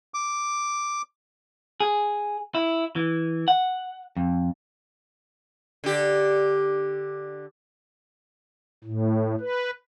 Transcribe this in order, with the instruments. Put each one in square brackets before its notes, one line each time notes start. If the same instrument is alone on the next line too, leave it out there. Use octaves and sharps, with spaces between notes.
[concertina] D6
[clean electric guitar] G#4
E4
E3
F#5
F2
[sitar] D3 G4
[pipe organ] A2
B4